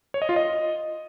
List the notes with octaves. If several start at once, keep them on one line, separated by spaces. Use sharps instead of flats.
C#5
D#5
F4
D#5